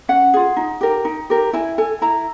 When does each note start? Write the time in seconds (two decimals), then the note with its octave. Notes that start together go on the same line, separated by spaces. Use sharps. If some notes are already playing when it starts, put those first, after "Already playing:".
0.09 C#4 F#5
0.34 F4 G#4
0.57 D#4
0.81 G4 A#4
1.05 D#4
1.30 G4 A#4
1.53 E4 G#5
1.78 A4 G#5
2.02 E4 A#5